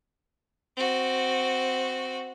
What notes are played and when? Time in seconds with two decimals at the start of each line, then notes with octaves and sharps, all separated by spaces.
0.77 C4 F#4